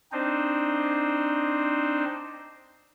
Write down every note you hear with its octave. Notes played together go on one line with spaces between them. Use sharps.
C4 D4 D#4 C5